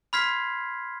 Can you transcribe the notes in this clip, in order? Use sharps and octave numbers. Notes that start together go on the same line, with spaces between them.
B5 C6 F6 G#6 B6 C7